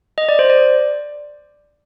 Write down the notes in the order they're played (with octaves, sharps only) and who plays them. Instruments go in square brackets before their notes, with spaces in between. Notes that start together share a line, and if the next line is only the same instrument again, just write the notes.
[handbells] D#5
D5
C5
D5